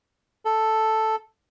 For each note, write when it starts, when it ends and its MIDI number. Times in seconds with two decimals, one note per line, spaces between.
0.45 1.16 69